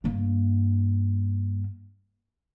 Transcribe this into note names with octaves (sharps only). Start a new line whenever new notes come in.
G2 A#3